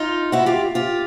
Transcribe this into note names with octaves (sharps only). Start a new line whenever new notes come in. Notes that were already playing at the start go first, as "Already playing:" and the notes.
Already playing: D#4 F4
E4 F#4
F4 G4
F4 G4